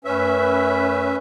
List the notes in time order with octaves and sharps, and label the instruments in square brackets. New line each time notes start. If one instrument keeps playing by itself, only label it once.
[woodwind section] F#2 A3 B4 [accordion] C#4 E5